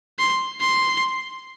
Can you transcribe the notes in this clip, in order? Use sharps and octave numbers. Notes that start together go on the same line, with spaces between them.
C6
C6